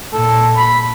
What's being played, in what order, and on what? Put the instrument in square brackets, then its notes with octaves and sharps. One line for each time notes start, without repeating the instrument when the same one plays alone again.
[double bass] A#2 [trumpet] A4
[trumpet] B5